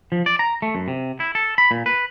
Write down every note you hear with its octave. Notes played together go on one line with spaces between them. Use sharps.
F3
D5
A#5
A3
F#2
C3
E4
A4
B5
A#2
B4